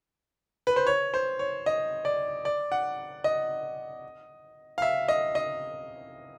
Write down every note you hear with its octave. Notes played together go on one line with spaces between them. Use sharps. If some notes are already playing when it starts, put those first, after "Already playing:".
B4
C5
C#5
C5
C#5
D#5
D5
D5
F#5
D#5
F5
E5
D#5
D#5